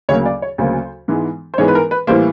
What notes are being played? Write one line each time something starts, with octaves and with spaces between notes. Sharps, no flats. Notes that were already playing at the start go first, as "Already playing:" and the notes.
D2 C#3 F#3 A#3 C#5
D5
C#5
D2 C#3 F#3 A#3 C5
G#2 E3 G#3 B3
C5
G#2 E3 G#3 B3 C#5
B4
A#4
B4
A2 E3 G3 A#3 C5